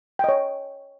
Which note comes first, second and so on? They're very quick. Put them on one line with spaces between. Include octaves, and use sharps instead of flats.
G5 D#5 C#5